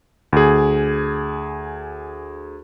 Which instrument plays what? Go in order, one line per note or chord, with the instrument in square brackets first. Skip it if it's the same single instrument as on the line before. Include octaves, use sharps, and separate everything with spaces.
[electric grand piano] D2 G#4